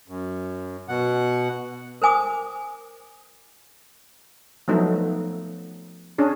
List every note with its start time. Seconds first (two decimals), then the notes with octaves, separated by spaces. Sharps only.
0.08 F#2
0.88 B2 F#5
2.02 A#4 C5 G#5 D6 D#6
4.68 F3 F#3 A3 B3 D#4
6.18 C#4 D4 G#4